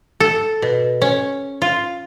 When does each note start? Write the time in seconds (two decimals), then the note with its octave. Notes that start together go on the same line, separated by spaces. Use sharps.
0.20 A4
0.62 B2
1.02 C#4
1.62 F4